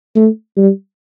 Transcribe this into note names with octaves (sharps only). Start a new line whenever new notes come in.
A3
G3